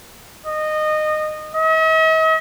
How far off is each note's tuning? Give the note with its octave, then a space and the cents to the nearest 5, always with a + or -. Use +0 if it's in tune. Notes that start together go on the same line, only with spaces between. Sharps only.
D#5 -20
D#5 +45